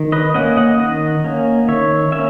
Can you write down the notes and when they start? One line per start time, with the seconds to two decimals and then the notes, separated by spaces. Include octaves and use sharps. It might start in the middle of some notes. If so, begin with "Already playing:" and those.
Already playing: D#3
0.12 B4 D#5
0.34 A#3 C#4 D#5 F#5
0.57 D#5 F#5
0.79 D#3 D#5 F#5
1.24 A#3 C#4
1.68 D#3 C#5 E5
2.12 A#3 C#4 C#5 E5